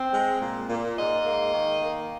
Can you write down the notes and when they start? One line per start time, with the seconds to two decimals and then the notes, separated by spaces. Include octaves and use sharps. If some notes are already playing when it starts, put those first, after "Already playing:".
Already playing: C4
0.13 G#3
0.41 A#2
0.69 A#2
0.97 G#2 D#5
1.26 A#3
1.54 D#3
1.82 A#3